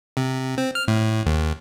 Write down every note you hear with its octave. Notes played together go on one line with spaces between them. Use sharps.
C3
C4
F6
A2
D#2